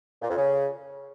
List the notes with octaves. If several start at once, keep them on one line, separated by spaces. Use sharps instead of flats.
A#2
F2
C#3